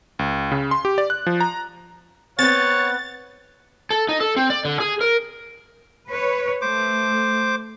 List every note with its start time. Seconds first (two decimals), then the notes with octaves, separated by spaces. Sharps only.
0.19 C#2
0.52 C#3
0.71 C6
0.85 G4
0.98 D5
1.10 F#6
1.27 F3
1.40 A#5
2.39 B3 C4 C#5 F#5 A6
3.90 A4
4.09 D#4
4.21 A4
4.36 C4
4.50 D5
4.65 D3
4.80 G#4
5.01 A#4
6.09 B4 C#5
6.61 A3 C5 D6